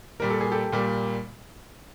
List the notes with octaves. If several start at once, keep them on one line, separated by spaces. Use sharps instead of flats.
A#2 G3 A#3 A#4
A4
G#4
G4 A4
A#2 G3 A#3